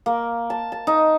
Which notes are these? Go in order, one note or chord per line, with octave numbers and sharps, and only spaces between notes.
A#3
A5
A5
D#4